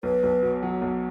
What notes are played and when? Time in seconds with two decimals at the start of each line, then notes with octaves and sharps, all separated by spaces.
0.03 B1 B4
0.23 B1
0.43 B2
0.63 F#3
0.82 B1